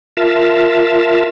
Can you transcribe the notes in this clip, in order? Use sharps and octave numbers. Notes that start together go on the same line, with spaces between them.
F4 A#4 E5 A5